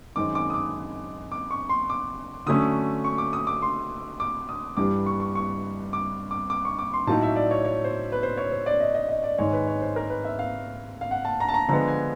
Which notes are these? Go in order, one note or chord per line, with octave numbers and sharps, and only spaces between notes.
F#2 D#3 G#3 C4 D6
D6
D#6
D6
D6
C#6
C6
D6
D3 F#3 A3 C#4 D#6
C#6
D6
D#6
D6
C6
D6
D#6
G2 E3 G3 D6
C#6
C#6
C#6
D6
D6
D6
C#6
D6
C6
A2 F#3 A#3 D#4 A5
E5
D5
C#5
C#5
C5
B4
C5
C#5
C5
D5
D#5
D#5
D#5
D5
G#2 D#3 G#3 C#5
B4
C#5
C5
A#4
B4
E5
F5
F5
F#5
A5
A#5
A5
A#5
D3 F3 G#3 B3 A#5
G#5